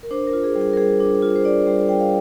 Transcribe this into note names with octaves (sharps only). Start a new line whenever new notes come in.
A#4
D4 C5
A#4
F4
G#4
G3
G#4
A#4
G3 G#4
D4
F4
C5
D4 D5
G3
G3 G5
F5